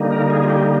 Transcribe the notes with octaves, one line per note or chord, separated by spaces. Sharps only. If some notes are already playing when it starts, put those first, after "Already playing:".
Already playing: D3 G3 A#3 D#4
A#4
G#4
F4
G4